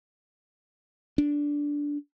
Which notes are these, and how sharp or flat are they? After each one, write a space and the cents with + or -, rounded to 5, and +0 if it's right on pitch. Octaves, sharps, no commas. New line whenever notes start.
D4 -10